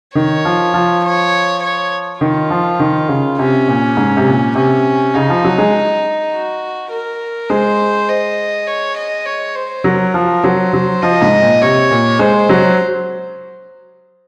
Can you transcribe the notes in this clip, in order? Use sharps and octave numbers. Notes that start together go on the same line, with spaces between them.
D#3 C#5
F3
F3
C#5
C#5
D#3 F4
F3
D#3
C#3
C3 C#4
A#2
G#2
C3
A#2
C3 C#4
C#3 D#4
F3
F#3
G#3
F#4
A#4
G#3 C5
D#5
C#5
D#5
C#5
C5
F#3 A#4
F3
F#3 C5
F#3
F3 D#5
G#2
A#2
C3 C#5
A#2
G#3 C5
F#3